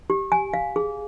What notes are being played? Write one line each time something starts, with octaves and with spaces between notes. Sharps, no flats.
G4
G#5
F5
G#4